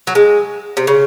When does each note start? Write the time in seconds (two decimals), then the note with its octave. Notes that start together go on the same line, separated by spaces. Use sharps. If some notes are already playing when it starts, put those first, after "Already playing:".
0.07 F#3
0.15 G#3
0.77 C3
0.87 C#3